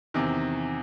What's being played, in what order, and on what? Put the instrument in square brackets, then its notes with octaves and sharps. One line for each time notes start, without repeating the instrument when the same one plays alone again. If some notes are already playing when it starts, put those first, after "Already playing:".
[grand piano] E2 C3 D#3